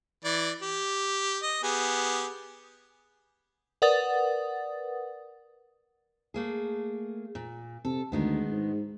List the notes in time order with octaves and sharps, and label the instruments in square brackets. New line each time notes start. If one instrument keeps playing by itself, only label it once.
[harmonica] E3 D5
G4
D#5
B3 G4 G#4
[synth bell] A#4 B4 D5 F#5 D#6 A6
[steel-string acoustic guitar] A3 A#3 G#4
A#2
[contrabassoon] C3 [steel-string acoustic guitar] A4
[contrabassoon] D2 [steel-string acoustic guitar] D#3 G#3 B3
[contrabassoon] G#2